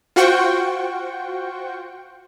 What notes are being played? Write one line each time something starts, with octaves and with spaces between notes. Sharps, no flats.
F4 F#4 C5 F#5 G5 C#6